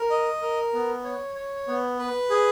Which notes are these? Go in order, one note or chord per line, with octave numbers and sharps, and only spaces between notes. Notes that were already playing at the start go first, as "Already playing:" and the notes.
Already playing: A#4
D#5
A#4
B3
C#5
C#5
B3
B4
G#4